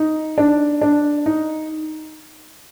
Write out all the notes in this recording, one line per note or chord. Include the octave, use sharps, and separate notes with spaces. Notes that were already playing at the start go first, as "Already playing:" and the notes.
Already playing: D#4
D4
D4
D#4